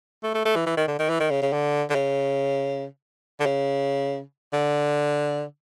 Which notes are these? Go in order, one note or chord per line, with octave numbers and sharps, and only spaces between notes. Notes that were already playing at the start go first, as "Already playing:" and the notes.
A3
A3
A3
E3
E3
D#3
D3
D#3
E3
D#3
C#3
C#3
D3
D3
C#3
D3
C#3
D3